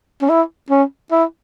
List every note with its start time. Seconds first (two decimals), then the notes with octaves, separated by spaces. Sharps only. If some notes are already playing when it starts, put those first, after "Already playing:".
0.22 C#4
0.30 E4
0.70 C#4
1.12 E4